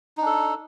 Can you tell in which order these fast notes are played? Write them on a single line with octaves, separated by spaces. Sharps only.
D#4 D4 A4